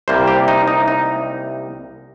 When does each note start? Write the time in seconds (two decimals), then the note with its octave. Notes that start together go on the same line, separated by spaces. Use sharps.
0.08 C2 C3 G3 A#3 C5
0.27 G4
0.48 D#4
0.68 D#4
0.88 D#4